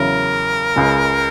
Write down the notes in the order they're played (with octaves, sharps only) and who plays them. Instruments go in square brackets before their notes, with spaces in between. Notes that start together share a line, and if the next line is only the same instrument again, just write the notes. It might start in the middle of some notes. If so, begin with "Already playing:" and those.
Already playing: [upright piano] E2 C#3 F#3 C#4 E4 [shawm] A#4
[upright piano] C#2 C#3 G#3